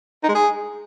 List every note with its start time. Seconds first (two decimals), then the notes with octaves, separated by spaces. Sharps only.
0.23 D#4
0.29 G#3
0.35 G#4